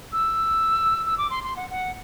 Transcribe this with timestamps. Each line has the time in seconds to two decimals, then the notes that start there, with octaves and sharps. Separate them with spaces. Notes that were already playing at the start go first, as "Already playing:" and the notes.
0.13 E6
1.06 E6
1.18 D6
1.30 C6
1.44 C6
1.56 F#5
1.70 F#5